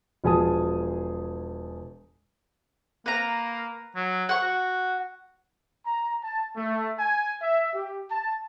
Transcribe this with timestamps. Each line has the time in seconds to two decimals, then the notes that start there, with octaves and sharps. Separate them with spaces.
0.24 E1 F3 G#4 G#5 A5 D#6
3.06 A#3 B4 A#5
3.96 F#3
4.29 F#5 C#6
4.43 F#4
5.86 A#5
6.24 A5
6.56 A3
7.00 G#5
7.42 E5
7.74 G4
8.11 A5